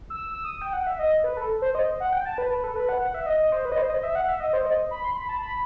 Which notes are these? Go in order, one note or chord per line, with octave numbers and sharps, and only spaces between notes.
E6
E6
D#6
G5
F#5
E5
D#5
B4
A4
C5
D#5
F#5
G5
A5
B4
B4
A4
B4
F#5
F#5
E5
D#5
D#5
C5
B4
D#5
C5
D#5
E5
F#5
E5
D#5
C5
D#5
B5
C6
B5
A5
B5